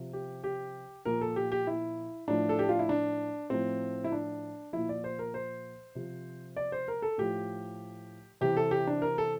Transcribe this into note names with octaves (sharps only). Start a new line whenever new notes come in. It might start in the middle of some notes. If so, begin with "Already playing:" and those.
Already playing: C3 F3
G4
G4
A#2 F3 A#4
A4
G4
G4
E4
A2 F3 D4
A4
G4
F4
E4
D4
A2 F3 C4
E4
D4
A#2 F3 E4
D5
C5
A#4
C5
C3 F3
D5
C5
A#4
A4
A2 F3 G4
C3 E3 G4
A4
G4
D4
A#4
A4